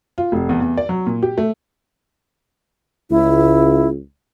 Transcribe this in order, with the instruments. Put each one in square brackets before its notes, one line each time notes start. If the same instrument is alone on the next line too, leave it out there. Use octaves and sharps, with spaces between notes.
[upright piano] F4
F1
E2
E2
D5
F#3
A#2
G4
A3
[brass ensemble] C#2 [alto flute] E4